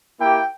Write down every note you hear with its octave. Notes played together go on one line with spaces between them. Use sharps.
A#3 E4 G4 G5